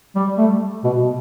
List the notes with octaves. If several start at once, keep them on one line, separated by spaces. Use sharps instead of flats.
G3
A3
B2